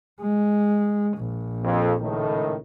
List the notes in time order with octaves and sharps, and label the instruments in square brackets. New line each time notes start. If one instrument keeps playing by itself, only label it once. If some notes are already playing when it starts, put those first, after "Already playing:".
[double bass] G#3
A#1
[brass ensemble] F2
C#2 A2 D#3